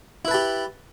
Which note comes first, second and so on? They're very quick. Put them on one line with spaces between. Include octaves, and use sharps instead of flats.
E4 B4 A5 G4